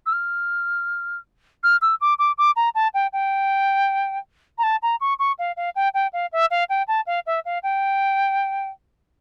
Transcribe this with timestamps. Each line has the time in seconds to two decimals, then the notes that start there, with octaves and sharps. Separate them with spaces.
0.06 E6
0.12 F6
1.63 F6
1.82 E6
2.01 D6
2.19 D6
2.38 D6
2.56 A#5
2.75 A5
2.94 G5
3.13 G5
4.58 A#5
4.63 A5
4.83 A#5
5.01 C#6
5.19 C#6
5.39 F5
5.57 F5
5.76 G5
5.94 G5
6.13 F5
6.33 E5
6.51 F5
6.70 G5
6.88 A5
7.07 F5
7.27 E5
7.45 F5
7.63 G5